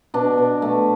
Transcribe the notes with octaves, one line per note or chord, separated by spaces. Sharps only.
B2 D4
B2
A3